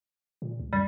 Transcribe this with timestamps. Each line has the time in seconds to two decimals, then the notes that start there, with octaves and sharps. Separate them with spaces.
0.42 A#2
0.60 C#2
0.73 F#2 G3